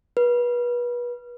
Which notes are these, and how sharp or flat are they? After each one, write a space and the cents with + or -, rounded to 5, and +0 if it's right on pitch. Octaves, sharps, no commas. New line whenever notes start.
B4 -30